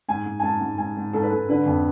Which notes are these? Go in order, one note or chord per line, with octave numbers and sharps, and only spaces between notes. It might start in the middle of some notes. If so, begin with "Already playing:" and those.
G#2 G#5
G#2
G#5
G#2 A5
G#2
G#2 G#5
G#2
G#2 A4
B4
G#2 A4
D3 B4
F2